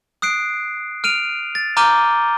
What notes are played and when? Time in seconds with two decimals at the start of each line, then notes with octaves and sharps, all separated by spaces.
0.22 D#6 F#6 C7 D7
1.04 F6 D7 D#7 F7
1.55 A6
1.77 A#5 D6 F6 G6 D#7 G7